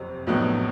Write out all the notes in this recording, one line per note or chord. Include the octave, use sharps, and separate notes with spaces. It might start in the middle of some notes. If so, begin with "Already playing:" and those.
Already playing: F#1 F2 C3
A#1 A2 F#3 B3 D#4